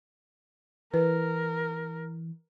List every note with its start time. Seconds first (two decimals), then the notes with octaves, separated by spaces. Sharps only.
0.94 E3 A#4 B4